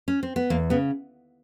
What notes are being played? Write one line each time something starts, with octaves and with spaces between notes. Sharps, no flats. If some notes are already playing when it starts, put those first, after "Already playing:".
C#4
C4
B3
E2 A#3
C#3 B3